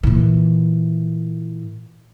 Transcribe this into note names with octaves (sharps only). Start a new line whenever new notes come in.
A#2 E3